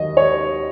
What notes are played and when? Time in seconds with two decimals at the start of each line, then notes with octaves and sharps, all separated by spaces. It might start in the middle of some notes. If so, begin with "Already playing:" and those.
Already playing: D#2 D#3 F#3 D#5
0.17 C#5